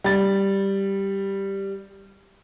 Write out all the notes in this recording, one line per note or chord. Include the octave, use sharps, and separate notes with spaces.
G3 A6